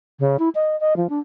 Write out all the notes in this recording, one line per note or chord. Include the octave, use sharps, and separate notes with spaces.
C#3
E4
D#5
D#5
F3
D4